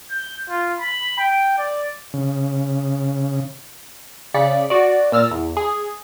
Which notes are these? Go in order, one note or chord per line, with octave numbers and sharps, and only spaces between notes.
G6
F4
B5
G5
D5
C#3
C#3 D5 B6 C#7
F#4 D5
A#2 E6 F6 A6 A#6
E2
G#4